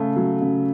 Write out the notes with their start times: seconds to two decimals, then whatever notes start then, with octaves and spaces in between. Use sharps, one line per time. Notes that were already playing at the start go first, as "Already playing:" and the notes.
Already playing: C#3 A3
0.16 F#3
0.42 C#3